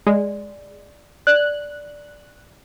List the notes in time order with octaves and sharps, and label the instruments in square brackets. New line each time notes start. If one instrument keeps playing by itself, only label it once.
[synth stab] G#3 [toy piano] D5
[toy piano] D5 [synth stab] F#6